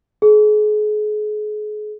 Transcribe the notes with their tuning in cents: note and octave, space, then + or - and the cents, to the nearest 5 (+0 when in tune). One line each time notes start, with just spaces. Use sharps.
G#4 +35